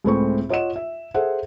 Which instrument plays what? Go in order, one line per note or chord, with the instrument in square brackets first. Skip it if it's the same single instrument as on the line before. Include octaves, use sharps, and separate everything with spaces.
[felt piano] C#2 A2 A3 C4 C#6
F4 C#5 D#5 F#5 E7
E5
G#4 A4 C5 E5 F#5